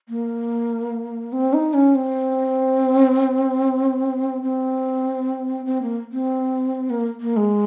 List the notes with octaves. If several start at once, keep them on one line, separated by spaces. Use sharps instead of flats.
A#3
C4
D#4
C#4
C4
C4
C4
A#3
C4
A#3
A#3
G#3